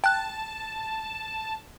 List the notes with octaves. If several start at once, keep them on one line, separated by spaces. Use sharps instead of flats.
G5 A5 F#6